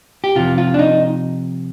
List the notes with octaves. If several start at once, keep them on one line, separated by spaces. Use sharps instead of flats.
G4
C3 F3 F4
F4
D4
D#4